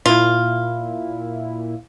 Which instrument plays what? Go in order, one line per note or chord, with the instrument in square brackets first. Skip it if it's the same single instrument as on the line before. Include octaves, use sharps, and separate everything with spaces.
[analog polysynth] A#2 E4 [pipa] F4